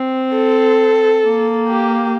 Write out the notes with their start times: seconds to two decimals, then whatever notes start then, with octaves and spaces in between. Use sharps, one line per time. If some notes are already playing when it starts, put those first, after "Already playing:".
Already playing: C4
0.34 A4
1.24 A#3
1.68 G4